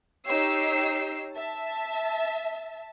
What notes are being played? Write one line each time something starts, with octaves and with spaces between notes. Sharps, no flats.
D#4 G4 C#5 E6 C7
E5 A5